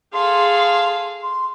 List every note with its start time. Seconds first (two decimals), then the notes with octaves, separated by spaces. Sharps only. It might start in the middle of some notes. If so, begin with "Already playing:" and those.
0.13 G#4 A4 F5 C6
1.22 C6